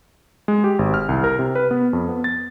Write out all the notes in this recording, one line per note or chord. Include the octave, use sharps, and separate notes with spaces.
G#3
G4
G#1
F6
C2
A#4
C3
B4
B3
F2
B3
A6